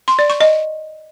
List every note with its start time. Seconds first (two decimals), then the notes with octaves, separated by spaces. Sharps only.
0.08 C6
0.19 D5
0.30 C#6
0.41 D#5